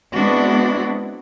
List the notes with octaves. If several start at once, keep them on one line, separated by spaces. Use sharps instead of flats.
G#3 B3 C4 D4 E4 F#4